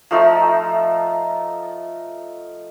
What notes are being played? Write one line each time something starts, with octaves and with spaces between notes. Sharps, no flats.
F3 A3 D#4 F4